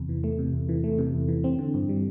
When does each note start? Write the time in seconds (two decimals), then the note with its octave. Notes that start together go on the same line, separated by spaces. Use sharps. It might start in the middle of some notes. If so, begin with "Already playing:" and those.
Already playing: E2 C3
0.09 E3
0.24 A3
0.39 C3
0.53 E2
0.69 E3
0.84 A3
0.99 C3
1.14 E2
1.28 E3
1.44 C4
1.59 D3
1.74 G2
1.89 G3